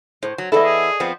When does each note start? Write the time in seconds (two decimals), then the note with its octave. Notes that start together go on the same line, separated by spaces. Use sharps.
0.23 A2 C5
0.38 F#3
0.52 E3 B3 E4 A4 D5 D#5
0.65 G#4
1.00 F3 B3 C4